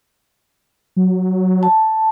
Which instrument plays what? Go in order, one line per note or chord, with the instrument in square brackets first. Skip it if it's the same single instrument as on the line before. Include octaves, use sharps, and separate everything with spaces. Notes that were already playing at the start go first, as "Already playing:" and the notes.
[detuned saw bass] F#3
[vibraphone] A5